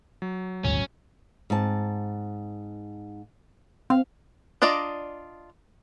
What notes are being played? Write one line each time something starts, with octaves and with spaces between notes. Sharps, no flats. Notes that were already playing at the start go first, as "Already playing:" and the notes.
F#3
D#1 G#1 D2 C#4
G#2 C4 A5
C4 F5
D4 F4 D5 D#5 A#5